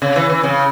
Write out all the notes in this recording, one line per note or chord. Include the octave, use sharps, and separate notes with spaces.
C#3
E3
E3
C#3